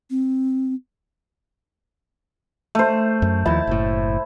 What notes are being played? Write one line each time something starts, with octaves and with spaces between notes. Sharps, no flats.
C4
A3 C5
F#2
D#2 F3 E4 A5
F#1 A2